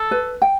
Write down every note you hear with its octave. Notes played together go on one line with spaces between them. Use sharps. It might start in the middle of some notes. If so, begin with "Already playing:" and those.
Already playing: A4
B4
G5